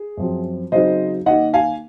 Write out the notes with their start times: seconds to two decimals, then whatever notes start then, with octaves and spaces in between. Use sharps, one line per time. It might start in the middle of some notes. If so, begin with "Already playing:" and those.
Already playing: G#4
0.17 F#2 F3 C4
0.72 C#3 F#3 C4 D#4 C5 D#5
1.26 D#3 A#3 D#4 D#5 F#5
1.54 F5 G#5